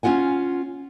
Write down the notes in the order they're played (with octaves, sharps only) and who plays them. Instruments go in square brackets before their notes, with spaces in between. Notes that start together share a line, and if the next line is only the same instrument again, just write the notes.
[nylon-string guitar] C#4 E4 F4 F#5 G#5